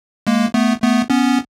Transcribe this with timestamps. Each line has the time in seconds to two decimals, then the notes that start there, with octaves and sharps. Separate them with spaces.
0.27 G#3 A#3
0.54 A3 B3
0.82 A3 B3
1.10 B3 C#4